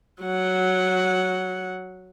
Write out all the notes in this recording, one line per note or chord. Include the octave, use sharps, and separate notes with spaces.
F#3 F#5